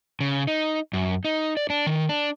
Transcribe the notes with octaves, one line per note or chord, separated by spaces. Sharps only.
C#3
D#4
F#2
D#4
D5
D4
D#3
D4